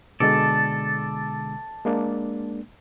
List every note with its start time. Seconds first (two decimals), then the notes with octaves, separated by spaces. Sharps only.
0.20 B2 D3 G#3 A4 D5
1.85 G#3 A#3 D4